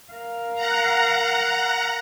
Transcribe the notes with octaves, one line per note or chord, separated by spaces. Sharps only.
A#4 F5
F#5 A#5